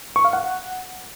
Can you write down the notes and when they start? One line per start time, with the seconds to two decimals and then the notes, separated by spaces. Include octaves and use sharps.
0.16 C#6
0.25 F5
0.33 F#5